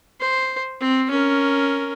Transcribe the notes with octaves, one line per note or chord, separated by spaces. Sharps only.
C5
C4
C#4 A#4